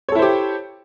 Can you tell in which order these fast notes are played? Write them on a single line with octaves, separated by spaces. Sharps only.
C#5 A4 E4 C5 G4